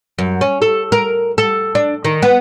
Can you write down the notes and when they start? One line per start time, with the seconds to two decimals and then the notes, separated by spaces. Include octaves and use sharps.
0.19 F#2
0.41 C#4
0.62 A4
0.92 A#4
1.38 A4
1.75 D4
2.05 D#3
2.22 B3